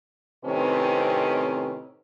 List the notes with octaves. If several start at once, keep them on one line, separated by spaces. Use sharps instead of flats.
A2 C3 D#3 C4 C#4 B4